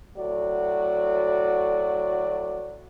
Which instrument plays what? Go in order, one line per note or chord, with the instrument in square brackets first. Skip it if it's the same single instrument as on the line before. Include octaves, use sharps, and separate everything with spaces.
[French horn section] A2 F#3 F#4 A4 D5